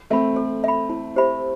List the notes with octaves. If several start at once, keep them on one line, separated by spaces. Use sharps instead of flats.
A3 C4 E5 B5
A4
E5 B5
E4
G4 C5 E5 B5